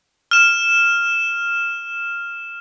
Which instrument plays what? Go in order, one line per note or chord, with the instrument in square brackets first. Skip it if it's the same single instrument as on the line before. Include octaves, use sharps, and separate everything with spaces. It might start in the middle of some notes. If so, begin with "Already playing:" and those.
[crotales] F6 E7